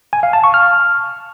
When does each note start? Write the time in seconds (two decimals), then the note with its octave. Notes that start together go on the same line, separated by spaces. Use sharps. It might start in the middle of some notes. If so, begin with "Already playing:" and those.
0.13 G#5
0.23 F5
0.33 A5
0.44 C#6
0.54 F6